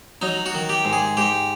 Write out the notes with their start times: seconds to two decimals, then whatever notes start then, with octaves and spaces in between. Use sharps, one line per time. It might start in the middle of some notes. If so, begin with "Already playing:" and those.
0.22 F#3 D#4
0.46 F#4
0.54 D#3
0.69 G4
0.85 G#2
0.93 G#4
1.17 G#2 G4